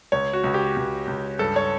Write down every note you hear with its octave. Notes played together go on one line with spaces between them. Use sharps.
C#2 C#5
F#4
C#2
G4
C#2
C#2
G2 A4
C#5